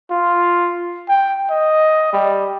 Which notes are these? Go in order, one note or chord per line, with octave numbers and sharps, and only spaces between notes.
F4
G5
D#5
G3